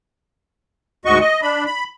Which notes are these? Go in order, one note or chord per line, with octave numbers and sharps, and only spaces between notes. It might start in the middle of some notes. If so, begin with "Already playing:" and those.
D2 G#2 F#4 D#5 C#6
D#5
D4 B5
B5